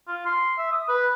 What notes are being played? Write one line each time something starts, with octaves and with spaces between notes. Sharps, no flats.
F4
C6
E5
D#6
B4